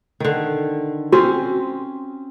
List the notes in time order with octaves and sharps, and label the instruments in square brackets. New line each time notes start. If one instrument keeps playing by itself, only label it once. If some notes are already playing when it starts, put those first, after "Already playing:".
[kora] D3 D#3
[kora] C4 C#4 [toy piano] F#4